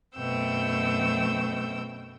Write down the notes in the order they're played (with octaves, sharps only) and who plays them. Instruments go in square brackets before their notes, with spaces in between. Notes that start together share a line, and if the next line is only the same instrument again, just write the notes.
[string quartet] F#2 B2 A3 C4 G5 E6